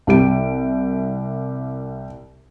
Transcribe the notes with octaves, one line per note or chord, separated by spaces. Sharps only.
C2 G4 D7